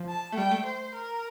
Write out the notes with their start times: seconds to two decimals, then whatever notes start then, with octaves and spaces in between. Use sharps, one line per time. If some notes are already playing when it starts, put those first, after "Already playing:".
Already playing: F3
0.09 A5
0.32 A3
0.36 G3 G5
0.51 A3
0.65 C5
0.95 A#4